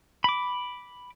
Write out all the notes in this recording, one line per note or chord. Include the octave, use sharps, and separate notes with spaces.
B5 D6